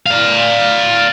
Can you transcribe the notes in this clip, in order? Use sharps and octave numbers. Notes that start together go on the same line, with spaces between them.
D5 F5